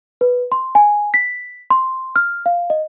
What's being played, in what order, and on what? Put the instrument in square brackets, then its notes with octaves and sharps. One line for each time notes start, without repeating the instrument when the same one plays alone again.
[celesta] B4
C6
G#5
B6
C6
F6
F5
D#5